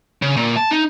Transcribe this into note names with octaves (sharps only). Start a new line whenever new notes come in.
C#3
A#2
A5
D#4